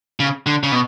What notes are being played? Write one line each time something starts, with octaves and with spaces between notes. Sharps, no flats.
C#3
D3
C#3
B2